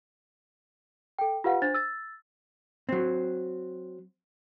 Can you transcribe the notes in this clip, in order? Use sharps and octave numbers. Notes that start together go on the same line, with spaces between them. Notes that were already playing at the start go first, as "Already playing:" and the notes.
A4 G5
F4 G4 B4 F5 F#5
D4 C5 A6
E6 A6
F#3 C4